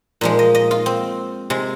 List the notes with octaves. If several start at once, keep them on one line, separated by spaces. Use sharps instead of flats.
A#2 F3 G#3
D#5
D#5
F4
C4
C3 G#3